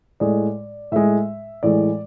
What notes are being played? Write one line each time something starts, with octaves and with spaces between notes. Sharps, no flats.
A2 G#3 D5
A2 G#3 E5
A2 E3 G#3 D5